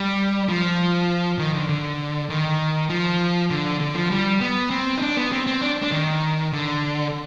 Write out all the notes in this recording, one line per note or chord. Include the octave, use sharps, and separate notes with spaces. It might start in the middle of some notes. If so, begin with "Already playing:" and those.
Already playing: G3
F3
D#3
D3
D3
D#3
F3
D3
D3
F3
G3
B3
C4
D#4
D4
B3
C4
C4
D4
D4
D#3
D3